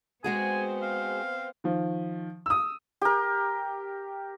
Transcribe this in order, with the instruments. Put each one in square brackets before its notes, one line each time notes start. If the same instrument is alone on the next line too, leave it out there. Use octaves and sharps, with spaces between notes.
[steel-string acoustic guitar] G#3 F#4 G#4 [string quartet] B3 C4 C5 [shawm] G#5
[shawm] F5
[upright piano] D#3 F3
D#6 E6
[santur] G4 A#4